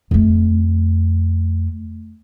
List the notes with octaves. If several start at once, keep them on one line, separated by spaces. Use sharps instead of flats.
F2 A3